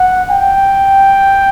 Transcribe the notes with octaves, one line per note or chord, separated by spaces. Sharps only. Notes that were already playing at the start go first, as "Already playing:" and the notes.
Already playing: F#5
G5